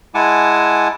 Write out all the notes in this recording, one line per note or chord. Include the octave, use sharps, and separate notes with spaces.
G#3 E4 F#5 G#5 A5 D6